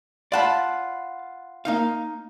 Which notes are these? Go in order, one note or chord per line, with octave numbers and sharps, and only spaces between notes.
F4 D5 F#5 A5 B5
A#3 D#4 F5